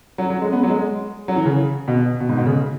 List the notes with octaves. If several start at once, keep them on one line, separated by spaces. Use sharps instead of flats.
F#3
F#3
G#3
B3
F#3
G#3
F#3
E3
C#3
B2
B2
G#2
B2
C#3